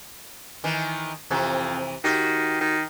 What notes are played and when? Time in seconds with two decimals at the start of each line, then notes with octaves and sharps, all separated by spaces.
0.64 D#3 E3
1.31 F2 C3 E3
2.04 D#3 F#4 G4
2.61 D#3